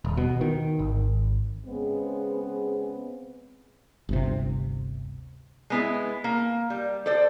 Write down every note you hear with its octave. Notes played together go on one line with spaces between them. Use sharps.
D#1
B2
D#3
G#1
C#3 G#3 B3 C4 G#4
G1 D2 C3
G#3 B3 E4
A#3
G3
A4 C5 D5